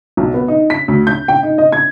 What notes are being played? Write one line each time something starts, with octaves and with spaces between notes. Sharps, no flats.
B1
B3
D#4
B6
D2
G6
G5
D#4
D#5
G#6